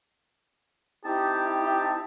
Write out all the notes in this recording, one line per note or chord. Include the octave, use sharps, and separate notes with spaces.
C4 D#4 E4 G4 A5